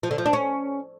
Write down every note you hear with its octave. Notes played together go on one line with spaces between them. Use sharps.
F3
D3
F3
D4
C#4